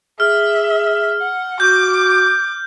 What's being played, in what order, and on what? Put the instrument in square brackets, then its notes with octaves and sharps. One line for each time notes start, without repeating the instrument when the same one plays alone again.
[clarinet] G#4 [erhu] E5 [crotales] F6
[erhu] F#5
[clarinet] F#4 [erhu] D6 [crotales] G6